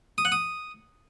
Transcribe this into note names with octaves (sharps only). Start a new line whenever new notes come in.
D#6
F#5
D#6